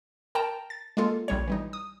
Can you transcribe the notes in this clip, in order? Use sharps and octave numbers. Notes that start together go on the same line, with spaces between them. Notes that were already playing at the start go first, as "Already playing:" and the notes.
A#4 G5 A5 A#5
A6
G#3 A#3 F4 A4
A#1 G3 C#5
E3 G3 D#4
D#6